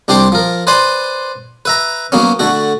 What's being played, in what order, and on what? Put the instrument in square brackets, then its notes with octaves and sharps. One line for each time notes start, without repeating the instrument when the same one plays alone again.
[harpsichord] C2 D4 G4 C5 C6 D6
F3 A#4
B4 C5 D5 G#5 B5 C6
B4 E5 A#5
F#3 A#3 B3 C#4
D3 A3 F#4